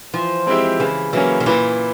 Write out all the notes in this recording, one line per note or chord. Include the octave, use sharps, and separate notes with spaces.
E3 F3
G#3 C4 E4 G4
C#3 E3
E3 F#3 A#3 C#4
D#3
A#2 E3